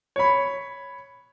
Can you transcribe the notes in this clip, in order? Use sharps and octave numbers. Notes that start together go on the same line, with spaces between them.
C#5 B5